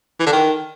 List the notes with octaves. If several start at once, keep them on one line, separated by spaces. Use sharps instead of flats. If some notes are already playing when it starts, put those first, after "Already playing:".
E3
D3
D#3